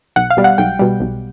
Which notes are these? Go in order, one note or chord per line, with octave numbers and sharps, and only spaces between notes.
B1 F#5
F5
B2 G3
F#5
B1 G5
B2 G3
B1